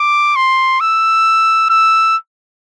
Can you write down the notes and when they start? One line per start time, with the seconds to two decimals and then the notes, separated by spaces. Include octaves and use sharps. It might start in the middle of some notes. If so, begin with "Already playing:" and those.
Already playing: D6
0.36 C6
0.81 E6
1.69 E6